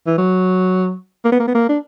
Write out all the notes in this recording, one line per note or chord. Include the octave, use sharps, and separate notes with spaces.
E3
F#3
A#3
B3
A#3
B3
A#3
D4